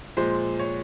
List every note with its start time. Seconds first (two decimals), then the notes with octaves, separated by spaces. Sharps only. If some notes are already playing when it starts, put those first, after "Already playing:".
0.17 A#2 F3 G#3 C5
0.59 C#5